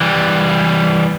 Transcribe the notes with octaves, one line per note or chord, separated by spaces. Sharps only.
E3 G3